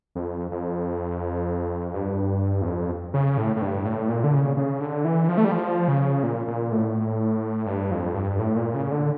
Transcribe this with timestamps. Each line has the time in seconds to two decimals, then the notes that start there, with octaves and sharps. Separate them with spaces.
0.15 F2
0.51 F2
1.94 G2
2.62 E2
2.66 F2
3.14 C#3
3.37 A2
3.56 A2
3.62 G2
3.85 A2
4.09 A#2
4.24 D3
4.33 C#3
4.57 C#3
4.80 D3
5.05 E3
5.29 F3
5.37 A3
5.45 G3
5.52 F3
5.88 C#3
6.23 A#2
6.48 A#2
6.72 A2
7.66 G2
7.91 F2
8.15 G2
8.39 A2
8.56 A#2
8.74 C#3
8.92 D3